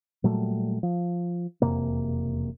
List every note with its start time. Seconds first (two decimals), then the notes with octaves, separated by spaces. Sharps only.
0.24 A#2 F#3 G3 A3
0.83 F3
1.62 E1 F2 C3 A#3